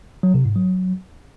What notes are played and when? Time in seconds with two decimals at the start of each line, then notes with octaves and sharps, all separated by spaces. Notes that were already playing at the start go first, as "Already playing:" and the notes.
0.23 F#3
0.34 C3
0.45 G#2
0.56 F#3